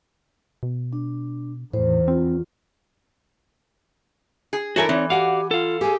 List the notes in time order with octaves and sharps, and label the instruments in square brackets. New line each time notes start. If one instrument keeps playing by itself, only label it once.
[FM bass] B2
[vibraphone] D4
[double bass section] E2 D#3 [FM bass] A2 [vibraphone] C5
[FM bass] C4 [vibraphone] F4
[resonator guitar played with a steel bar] G#4
[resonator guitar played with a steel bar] E3 A4 A#4 [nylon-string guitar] D4 E4 [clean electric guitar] F#4 C#5 G#5
[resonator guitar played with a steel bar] E3 [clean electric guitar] C4 D#4 C#5 [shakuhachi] D5
[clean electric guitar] F#4 D5 F5 [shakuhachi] G4 [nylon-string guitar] F#5 G#5
[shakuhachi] F4 [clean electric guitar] A4 F5
[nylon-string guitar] G4 G#4 [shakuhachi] G#5